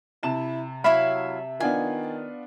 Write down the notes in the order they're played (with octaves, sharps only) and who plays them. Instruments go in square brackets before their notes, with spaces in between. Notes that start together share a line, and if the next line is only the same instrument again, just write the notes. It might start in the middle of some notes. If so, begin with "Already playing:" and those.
[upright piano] C3 A5 E7 [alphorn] E4
[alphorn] F#3 [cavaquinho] E4 C#5 F5 [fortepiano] E5 B5
[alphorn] D#3 [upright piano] B3 D4 F4 [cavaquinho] G#5